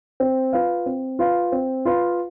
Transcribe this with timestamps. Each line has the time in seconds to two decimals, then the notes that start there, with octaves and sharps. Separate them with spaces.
0.20 C4
0.53 F4 B4 F5
0.86 C4
1.19 F4 B4 F5
1.52 C4
1.85 F4 B4 F5